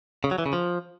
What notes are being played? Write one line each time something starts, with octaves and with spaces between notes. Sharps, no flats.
C#3
F#3
E3
C#3
F3